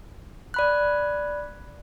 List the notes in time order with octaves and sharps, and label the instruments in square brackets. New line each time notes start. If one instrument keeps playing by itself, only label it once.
[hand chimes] D5 B5 F#6